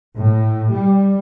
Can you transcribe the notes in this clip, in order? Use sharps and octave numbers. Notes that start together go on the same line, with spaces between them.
A2
G3